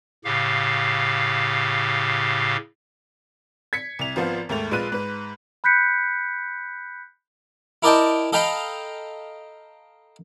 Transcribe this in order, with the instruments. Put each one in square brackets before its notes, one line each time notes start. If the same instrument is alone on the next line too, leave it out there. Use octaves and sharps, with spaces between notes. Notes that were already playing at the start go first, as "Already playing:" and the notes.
[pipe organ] A2 C#3 G4 F5
[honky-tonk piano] G#6 B6 C#7
C2 F7
G#1 F3 B3 C5 F5
D#2 G#2 A3 F7
A#1 G#3 F4 B4 F#6 D#7
G#2 B4
[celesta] B5 F#6 G6 B6 C#7
[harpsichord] E4 A#4 D5 D#5 G5 A5
A4 D#5 F5 G5 A#5 B5